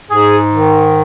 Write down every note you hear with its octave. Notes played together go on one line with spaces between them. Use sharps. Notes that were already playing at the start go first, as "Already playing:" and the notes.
G#2 G#4
D#3